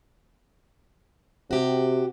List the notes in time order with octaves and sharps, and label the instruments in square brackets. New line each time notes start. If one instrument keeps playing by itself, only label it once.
[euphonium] C3 [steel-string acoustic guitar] F#4 G4